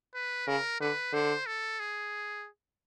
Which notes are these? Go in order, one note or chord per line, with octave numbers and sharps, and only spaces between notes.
B4
C#3 A#4
D3 B4
D3 C5
A4
G#4